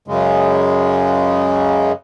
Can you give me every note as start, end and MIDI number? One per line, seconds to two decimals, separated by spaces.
0.08 1.92 42
0.08 1.92 49
0.08 1.92 56